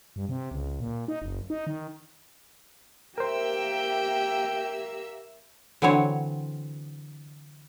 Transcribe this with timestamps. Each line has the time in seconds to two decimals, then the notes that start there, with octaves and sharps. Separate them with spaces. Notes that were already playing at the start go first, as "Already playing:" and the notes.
0.16 G2
0.29 C3
0.51 C#2
0.80 A#2
1.08 D#4
1.22 F#1
1.50 D#4
1.67 D#3
3.18 A#3 G4 A#4 C5 E5 G5 E6
5.82 D3 E3 F#3 C4 C#5